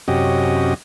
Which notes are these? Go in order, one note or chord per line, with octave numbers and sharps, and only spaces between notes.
F#2 C3 C#4 F#4 G4 D#5